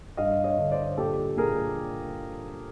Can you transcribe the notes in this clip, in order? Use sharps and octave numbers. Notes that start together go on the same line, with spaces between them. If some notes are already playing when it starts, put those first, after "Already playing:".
G2 D#5 F5
C#5 D#5
D3
C5 D5
A#2 G4 A4
A#2 G#4 A#4